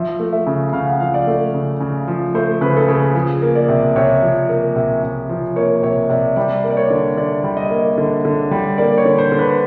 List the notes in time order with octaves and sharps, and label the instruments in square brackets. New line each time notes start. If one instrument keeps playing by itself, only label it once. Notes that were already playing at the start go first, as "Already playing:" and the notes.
Already playing: [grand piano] F3 E5
A3
E5
C#3
C#3 F5
F#5
F3 F5
D5
A3
C#3
C#3
F3
A3 C5
C#3 B4
A4
C#3 G#4
F3 G#4
A#3
D5
C3
C3 C#5
F3
A#3
C3
C3
F3
A#3 C#5
C3 C#5
C3 D5
G3 D5
A#3
D5
C#5
D3
D3 D5
G3
D#5
A#3
D3
D3
G3
A#3 D5
C#5
D3
C5
D3
B4